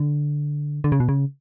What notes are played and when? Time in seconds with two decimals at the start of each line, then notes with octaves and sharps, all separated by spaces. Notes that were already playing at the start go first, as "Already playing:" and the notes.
Already playing: D3
0.84 D3
0.92 C#3
1.00 B2
1.09 C#3